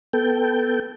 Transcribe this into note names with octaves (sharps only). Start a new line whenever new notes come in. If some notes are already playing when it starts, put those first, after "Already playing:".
B3 A4 G5